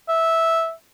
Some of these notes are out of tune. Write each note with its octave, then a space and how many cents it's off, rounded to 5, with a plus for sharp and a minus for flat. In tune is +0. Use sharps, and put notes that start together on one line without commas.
E5 -10